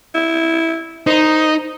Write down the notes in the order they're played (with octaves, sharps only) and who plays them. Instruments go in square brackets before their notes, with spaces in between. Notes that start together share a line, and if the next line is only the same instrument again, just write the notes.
[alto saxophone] E4
[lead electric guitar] D#4 [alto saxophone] C5